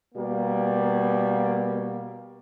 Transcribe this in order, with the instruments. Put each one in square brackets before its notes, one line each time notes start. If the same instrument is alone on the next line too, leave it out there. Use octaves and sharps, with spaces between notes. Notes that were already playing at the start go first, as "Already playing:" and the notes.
[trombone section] B2 G3 A#3